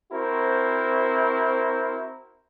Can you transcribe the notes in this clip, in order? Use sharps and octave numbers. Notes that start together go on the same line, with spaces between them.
C4 E4 F#4 A#4 C5